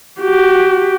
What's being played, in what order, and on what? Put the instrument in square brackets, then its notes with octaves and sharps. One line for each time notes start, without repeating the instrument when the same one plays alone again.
[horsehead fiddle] F#4 G4